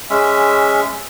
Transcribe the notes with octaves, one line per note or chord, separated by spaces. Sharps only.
G#3 C#4 E5